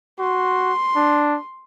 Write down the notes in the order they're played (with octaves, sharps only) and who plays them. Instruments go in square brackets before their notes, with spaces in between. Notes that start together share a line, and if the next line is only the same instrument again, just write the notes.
[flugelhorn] F#4 [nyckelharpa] C6
[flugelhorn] D4